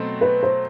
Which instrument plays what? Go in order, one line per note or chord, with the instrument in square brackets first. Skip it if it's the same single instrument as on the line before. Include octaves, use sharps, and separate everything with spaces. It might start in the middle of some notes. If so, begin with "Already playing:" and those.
Already playing: [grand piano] B2 F#3 A3 C4
[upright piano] B4
C5